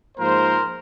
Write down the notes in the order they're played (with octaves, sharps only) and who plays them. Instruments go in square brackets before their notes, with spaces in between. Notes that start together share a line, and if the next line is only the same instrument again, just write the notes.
[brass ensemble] G#2 F3 A#3 A#4 C5